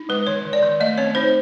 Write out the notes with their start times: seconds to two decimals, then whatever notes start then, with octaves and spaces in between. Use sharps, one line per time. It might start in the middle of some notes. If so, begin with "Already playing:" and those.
Already playing: D#4
0.09 G#3 B4
0.27 D#3 C#5
0.45 D#3
0.53 D5
0.63 D#3
0.80 A3 D#5
0.98 C4 C#5
1.15 D#4 C5